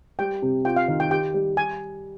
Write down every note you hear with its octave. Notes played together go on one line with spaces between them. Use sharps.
G3 G5
C3
F4 G5
F5
D#3
G5
G4 G5
G3
G4 G#5